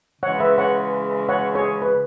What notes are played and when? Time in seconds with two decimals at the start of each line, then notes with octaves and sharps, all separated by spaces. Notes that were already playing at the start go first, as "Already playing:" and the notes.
0.22 C#3 E3 G#3 C#5 F#5
0.40 B4 E5
0.58 C#5 F#5
1.29 C#5 F#5
1.55 G#4 C#5
1.82 B4